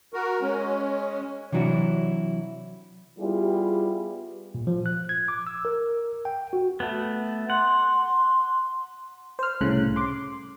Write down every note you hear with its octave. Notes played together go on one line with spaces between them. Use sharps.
F#4 A#4
G#3 C#4
C3 E3 F#3 D4 E4 F#4
G3 B3 E4 F4 G4 G#4
A#2
F3
F#6
G#6
D6
E6
A#4
G5
F#4
A3 B3
F#5 C6
C5 F6
C2 A2 C#3 F#6
C6 D6